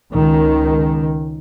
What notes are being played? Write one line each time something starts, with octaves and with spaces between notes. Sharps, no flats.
C#2 D#3